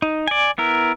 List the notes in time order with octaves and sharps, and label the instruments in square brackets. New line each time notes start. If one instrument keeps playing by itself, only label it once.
[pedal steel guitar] D#4
D5 G#5
B3 E4 A#4